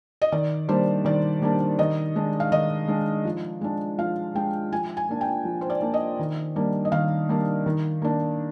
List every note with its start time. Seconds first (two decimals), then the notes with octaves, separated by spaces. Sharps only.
0.22 D#5
0.32 D#3 D5
0.68 G3 A#3 D4 C5
1.05 D#3 D5
1.42 G3 A#3 D4
1.79 D#3 D#5
2.16 G#3 D4
2.40 F5
2.52 D#3 D#5
2.88 G#3 D4
3.25 F3
3.61 G#3 D4
3.98 F3 F5
4.35 G#3 D4 G5
4.72 F3 G#5
4.97 G#5
5.09 A#3 D4
5.21 G5
5.45 F3
5.61 C5
5.70 D5
5.82 A#3 D4
5.94 D#5
6.19 D#3
6.56 G3 A#3 D4
6.85 D#5
6.92 D#3 F5
7.29 G3 A#3 D4
7.66 D#3
8.02 A#3 D4